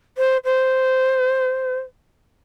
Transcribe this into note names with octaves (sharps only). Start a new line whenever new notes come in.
C5
C5